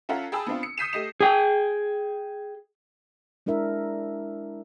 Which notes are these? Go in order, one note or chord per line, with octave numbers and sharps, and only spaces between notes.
C#4 F4 A4 E5 F#5 A#5
G#4 G5 A5 B5 D#6 E6
B3 C4 D4 F4
C#7
D#6 G6 B6 C7 D#7 E7
A3 G4 D#5 C7 E7
G#4 G5
G#3 D4 E4 A#4 E5